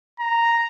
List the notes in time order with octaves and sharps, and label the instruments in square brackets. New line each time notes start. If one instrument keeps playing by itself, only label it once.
[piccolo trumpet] A#5